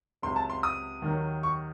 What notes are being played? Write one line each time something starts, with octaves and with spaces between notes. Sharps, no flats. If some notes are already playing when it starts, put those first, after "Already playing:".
C#2 C3 F#3 C6
A5
C6
D#6
D#2 D#3 F#3
C#6